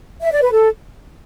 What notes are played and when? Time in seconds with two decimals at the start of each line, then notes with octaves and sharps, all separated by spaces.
0.22 E5
0.32 D5
0.42 B4
0.52 A4